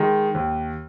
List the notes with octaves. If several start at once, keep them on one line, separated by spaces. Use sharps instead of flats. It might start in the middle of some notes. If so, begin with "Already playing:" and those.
Already playing: D#3 G#3
D#2